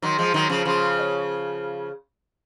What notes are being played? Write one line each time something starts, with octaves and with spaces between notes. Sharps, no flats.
D#3 F#3 C6
F3 G#3
D#3 F#3
C#3 F3
C#3 F3 C6
D#5
C#5